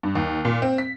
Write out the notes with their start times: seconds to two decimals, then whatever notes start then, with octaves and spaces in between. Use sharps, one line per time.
0.03 G2
0.15 D#2
0.45 A#2
0.62 C4
0.78 B6